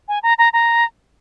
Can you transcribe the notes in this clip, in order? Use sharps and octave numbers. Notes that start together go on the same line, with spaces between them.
G#5
A#5
A#5
A#5